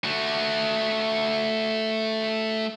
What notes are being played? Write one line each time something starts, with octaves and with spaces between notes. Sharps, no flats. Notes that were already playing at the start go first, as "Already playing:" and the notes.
A3 F#4